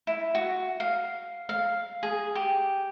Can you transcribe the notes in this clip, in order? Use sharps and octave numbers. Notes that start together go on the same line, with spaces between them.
E4
F#4
F5
F5
G#4
G4